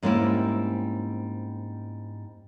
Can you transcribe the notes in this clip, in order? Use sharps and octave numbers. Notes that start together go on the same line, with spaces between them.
G#2 G3 A#3 C4 C#4 E4